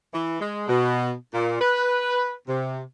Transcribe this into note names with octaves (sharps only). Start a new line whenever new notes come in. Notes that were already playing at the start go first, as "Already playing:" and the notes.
E3
G#3
B2
A#2
B4
C3